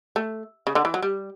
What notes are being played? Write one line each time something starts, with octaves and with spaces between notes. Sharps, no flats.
A3
C#3
D3
E3
F#3
G3